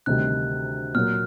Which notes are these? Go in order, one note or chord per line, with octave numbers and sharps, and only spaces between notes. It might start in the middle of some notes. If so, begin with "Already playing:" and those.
D2 C3 D#3 G3 F#6
A#2 F#3 A#3 F6